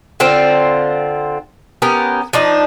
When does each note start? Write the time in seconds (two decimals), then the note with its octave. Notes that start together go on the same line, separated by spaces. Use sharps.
0.20 D3 C4 F4
1.82 B3 C#4 G4 A#4
2.33 F3 D4 D#4